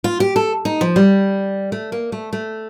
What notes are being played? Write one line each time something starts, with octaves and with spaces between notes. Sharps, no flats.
F4
G4
A4
D#4
F3
G3
A3
A#3
A3
A3